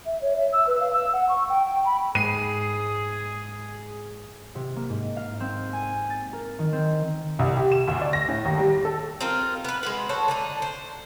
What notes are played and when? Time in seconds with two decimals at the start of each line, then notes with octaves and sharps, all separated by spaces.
0.06 E5
0.22 C#5
0.37 E5
0.53 E6
0.67 B4
0.80 F5
0.93 E6
1.13 F#5
1.29 C#6
1.49 G5
1.66 G5
1.86 B5
2.15 G#2 G#4 C7 D#7
4.55 C3
4.76 A#3
4.90 G#2
5.17 F5
5.40 C4
5.73 G#5
6.10 A6
6.33 A#4
6.59 D#3
6.72 C4
7.39 C2
7.57 G4
7.72 E7
7.88 D2
8.01 D5
8.13 A#6
8.29 A2
8.45 D#2
8.58 G3
8.85 A4
9.21 C4 D#4 F4 A#4
9.65 B3 B4
9.83 G#3 F#4 B4
10.09 F#4 A4 C5 C#5
10.28 D3 D4 D#4
10.62 C5